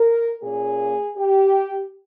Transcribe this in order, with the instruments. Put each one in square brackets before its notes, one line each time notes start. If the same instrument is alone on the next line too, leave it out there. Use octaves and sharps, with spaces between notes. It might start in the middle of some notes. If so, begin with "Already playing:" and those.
Already playing: [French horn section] A#4
A#2 A#3 C#4 G#4
G4